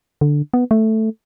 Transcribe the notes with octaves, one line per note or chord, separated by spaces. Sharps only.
D3
B3
A3